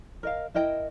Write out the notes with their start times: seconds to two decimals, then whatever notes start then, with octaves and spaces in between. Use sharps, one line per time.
0.23 A#4 D#5 F5
0.54 E4 A#4 D#5 G5